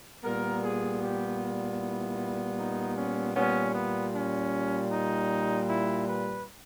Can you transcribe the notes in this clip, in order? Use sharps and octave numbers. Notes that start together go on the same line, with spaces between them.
A#2 G3 B3 A#4
G#4
G4
E4
D#4
C#4
A#2 G3 B3 C#4
B3
C#4
D#4
E4
B4